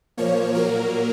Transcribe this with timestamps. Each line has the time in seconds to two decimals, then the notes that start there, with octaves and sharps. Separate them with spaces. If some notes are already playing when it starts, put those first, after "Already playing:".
0.18 A#2 F3 A#3 C#5
0.55 A#2 F#3 A#3 A#4